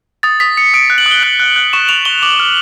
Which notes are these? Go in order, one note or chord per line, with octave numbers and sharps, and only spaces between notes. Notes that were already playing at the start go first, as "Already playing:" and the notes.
D#6 A6
D#6 B6
D#6 C#7
D#6 D7
F#6
F#7
D#6
G7
F#6 F#7
F#6
F#6
C#6 E7
C#6 F7
C#6 G7
D6 F#7
F6